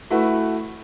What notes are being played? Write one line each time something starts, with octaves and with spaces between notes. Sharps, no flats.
A3 E4 F#4 B4